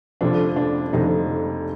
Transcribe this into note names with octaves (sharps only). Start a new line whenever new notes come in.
F1 F2 D3 F3 D4
D4
F1 F2 D3 F3 D#4